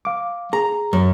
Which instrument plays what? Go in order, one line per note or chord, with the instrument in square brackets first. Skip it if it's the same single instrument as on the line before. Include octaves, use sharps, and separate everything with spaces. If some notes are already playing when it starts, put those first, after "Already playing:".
[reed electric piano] F5 D6
[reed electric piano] G#4 [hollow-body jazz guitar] A#5
[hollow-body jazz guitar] F#2